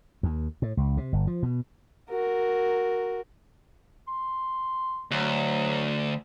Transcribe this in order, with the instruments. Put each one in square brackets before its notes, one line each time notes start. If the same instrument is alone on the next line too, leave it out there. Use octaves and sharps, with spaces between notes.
[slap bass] D#2
A2
C#2
C3
G1
F3
B2
[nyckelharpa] F#4 A#4
[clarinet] C6
[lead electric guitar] D2 [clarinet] F#3